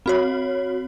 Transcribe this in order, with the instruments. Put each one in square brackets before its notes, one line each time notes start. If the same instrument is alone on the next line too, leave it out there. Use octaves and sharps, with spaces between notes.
[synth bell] C4 F#4 C#5